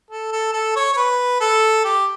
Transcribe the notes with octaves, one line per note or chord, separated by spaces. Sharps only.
A4
A4
A4
C#5
C#5
B4
A4
G4